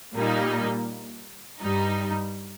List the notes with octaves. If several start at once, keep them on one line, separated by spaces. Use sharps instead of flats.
A#2 G3 A#3 D#4
G2 G3 D#4